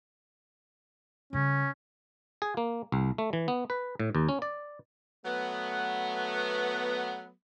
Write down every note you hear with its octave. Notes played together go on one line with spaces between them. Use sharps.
C#3 G3 C#4
G#4
A#3
C2
A3
E3
B3
B4
A2
D#2
C#4
D5
F#3 A3 B3